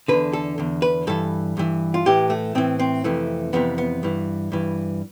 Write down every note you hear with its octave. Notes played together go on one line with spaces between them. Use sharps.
E2 D3 B4
A4
E2 D3
B4
G2 E3 A4
G2 E3
F4
A2 E3 G4
A3
A2 E3 C4
C4
F2 C3 E3 A3
F2 C3 E3 B3
B3
G2 E3
G2 E3